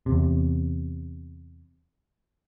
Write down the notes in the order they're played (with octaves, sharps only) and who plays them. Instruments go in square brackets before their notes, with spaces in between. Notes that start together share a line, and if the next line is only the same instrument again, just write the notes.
[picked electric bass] E2 C3